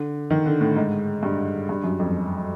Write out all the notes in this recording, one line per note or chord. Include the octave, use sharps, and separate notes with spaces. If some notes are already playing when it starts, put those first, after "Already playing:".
Already playing: D3
D#3
D3
A2
G#2
G2
G2
F#2
F2